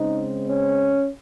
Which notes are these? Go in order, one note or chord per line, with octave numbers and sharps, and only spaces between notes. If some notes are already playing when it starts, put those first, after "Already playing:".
Already playing: C#3 G#3 C4 D#4
C#4